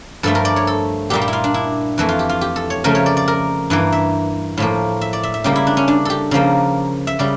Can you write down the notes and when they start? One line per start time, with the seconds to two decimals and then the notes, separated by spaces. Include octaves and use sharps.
0.23 G2 F3 A3 A4
0.35 A#4
0.45 D5
0.56 C#5
0.67 A4
1.10 A#2 G3 A#3 G4
1.21 G4
1.28 E4
1.33 F4
1.44 D4
1.54 E4
1.98 F2 E3 A3
2.09 F4
2.19 G4
2.29 F4
2.41 G4
2.56 A4
2.70 C#5
2.84 C#3 F3 A3 A#4
2.95 C#5
3.06 D5
3.17 D5
3.28 A#4
3.70 G2 E3 A#3
3.92 E5
4.58 A2 F3 A#3
5.01 E5
5.13 D5
5.23 E5
5.34 E5
5.44 C#3 G3 A#3 G4
5.56 E4
5.67 D4
5.77 C#4
5.88 D4
6.05 G4 A4
6.31 C#3 F3 A#3
7.07 E5
7.19 C#3 G3 D5